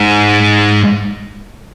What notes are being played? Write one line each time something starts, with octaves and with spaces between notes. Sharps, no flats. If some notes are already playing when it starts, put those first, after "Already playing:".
Already playing: G#2